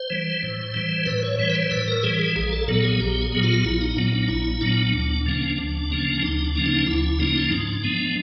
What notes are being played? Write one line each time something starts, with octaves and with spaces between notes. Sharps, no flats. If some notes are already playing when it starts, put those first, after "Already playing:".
Already playing: C5
E3 G3
A2
E3 G3
A2 B4
C#5
E3 G3 C#5
B4
C5
A2 B4
A#4
E3 G3 G#4
G#4
A#1 G#4
A4
A#2 F#3 B3 A4
G#4
A#1 G4
G#4
A#2 F#3 B3
F4
A#1 E4
D#4
A#2 F#3 B3 D4
D4
A#1 E4
A#2 F#3 B3 D4
D2 D4
C#3 F3 A#3 C#4
D2
C#3 F3 A#3 C#4
D2 D#4
D4
C#3 F3 A#3 C#4
D#4
D2 E4
C#3 F3 A#3 C#4 D#4
G#2 D4
F3 G#3 B3